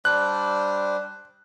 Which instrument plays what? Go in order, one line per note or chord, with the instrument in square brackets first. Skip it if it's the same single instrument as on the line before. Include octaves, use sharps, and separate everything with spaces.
[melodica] G3 D4 C5 [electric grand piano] F#6